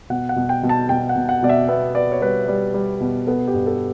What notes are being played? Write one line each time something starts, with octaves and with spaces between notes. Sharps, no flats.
B2 F#5
F#5
B2
G5
B2
A5
B2 G5
F#5
B2
F#5
B2 D5
E5
B3 E5
B3 D5
C#5
G3 B4
G3
G3
B2
B3 A4
G4
G2
A4